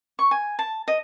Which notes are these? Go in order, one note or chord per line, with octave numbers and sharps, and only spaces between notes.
C#6
G#5
A5
D#5